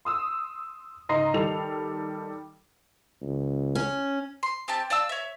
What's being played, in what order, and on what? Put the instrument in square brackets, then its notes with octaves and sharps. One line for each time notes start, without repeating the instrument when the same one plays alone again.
[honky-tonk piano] C6 D#6 E6
C#2 G#2 D#5 A#5 C6 C7
D#3 G3 A4 F7
[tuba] C#2
[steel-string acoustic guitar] C#4
[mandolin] C6
C4 G4 A5
D5 F5 A5 E6
C#5 E5